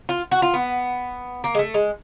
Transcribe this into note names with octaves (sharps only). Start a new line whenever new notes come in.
F4
F#4
F4
B3
A#3
G#3
A3
G#3